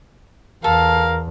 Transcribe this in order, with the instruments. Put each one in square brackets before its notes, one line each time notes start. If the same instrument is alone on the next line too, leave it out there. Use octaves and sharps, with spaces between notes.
[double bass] E2 [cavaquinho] A4 [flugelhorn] A#4 [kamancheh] F5